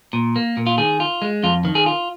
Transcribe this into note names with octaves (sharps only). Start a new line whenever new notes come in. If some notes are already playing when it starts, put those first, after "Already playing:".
A#2
A#3
A#2
F4
D#3 G#4
F4
G#3
F2 F4
D#3
G#4
F4